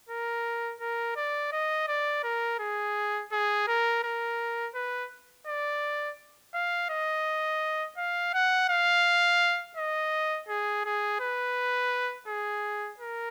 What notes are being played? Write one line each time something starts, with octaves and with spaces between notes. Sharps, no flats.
A#4
A#4
D5
D#5
D5
A#4
G#4
G#4
A#4
A#4
B4
D5
F5
D#5
F5
F#5
F5
D#5
G#4
G#4
B4
G#4
A#4